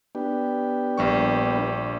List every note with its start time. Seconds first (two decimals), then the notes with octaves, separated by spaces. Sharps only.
0.15 B3 D4 G4
0.98 A#1 G3 C#6